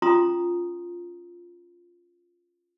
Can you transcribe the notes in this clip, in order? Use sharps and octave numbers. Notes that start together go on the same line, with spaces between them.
C#4 F4 A#5 C6 D#6